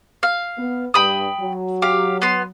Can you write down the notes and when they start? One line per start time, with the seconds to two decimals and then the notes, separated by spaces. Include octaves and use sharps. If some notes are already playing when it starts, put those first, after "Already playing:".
0.23 F5
0.58 B3
0.94 G2 G5 B5 D#6
1.40 F#3
1.82 G4 F5
2.22 B3 C6